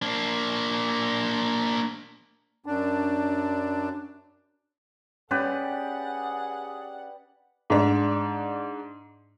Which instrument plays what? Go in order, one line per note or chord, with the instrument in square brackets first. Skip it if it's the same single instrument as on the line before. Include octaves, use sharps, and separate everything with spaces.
[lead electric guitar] A#3 D4
[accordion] F#2 D4
[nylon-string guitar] C#4 [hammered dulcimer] G4 B4 D5 [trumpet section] G#4 [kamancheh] F#5
[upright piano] G#2 D4